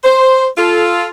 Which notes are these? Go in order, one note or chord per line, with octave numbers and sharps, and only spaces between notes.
C5
F4 A4